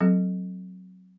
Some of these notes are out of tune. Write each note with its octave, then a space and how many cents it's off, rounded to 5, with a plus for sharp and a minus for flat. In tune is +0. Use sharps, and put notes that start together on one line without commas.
F#3 +0 C4 +0 A4 +0